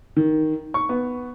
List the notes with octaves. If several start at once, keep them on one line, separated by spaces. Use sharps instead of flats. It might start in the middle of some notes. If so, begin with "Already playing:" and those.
D#3
C#6
B3